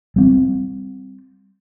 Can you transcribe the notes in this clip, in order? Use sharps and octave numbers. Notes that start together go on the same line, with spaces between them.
G3 C4